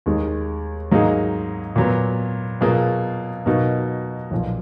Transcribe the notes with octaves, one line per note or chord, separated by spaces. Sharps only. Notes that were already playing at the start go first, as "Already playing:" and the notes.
D#2 D#3 G#3
G#2 F#3 A#3 D#4 G#4
A#2 F#3 B3
B2 F#3 A#3 F4 G#4
B2 F#3 A#3 D#4 F#4
B1 A#2 F3